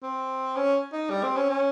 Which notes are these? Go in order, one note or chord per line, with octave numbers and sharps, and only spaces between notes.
C4
C#4
D#4
G3
C4
C#4
C#4